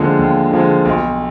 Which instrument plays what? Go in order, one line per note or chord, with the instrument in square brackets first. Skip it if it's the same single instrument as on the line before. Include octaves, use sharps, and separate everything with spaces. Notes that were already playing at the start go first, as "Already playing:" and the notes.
Already playing: [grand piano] D#2 D3 F3 G#3
D#2
D3 F3 G#3
B1